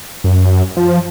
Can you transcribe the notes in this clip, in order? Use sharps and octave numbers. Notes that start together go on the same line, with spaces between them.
F#2
F3